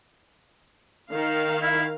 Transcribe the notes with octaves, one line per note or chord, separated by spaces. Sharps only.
D#3 F5
E4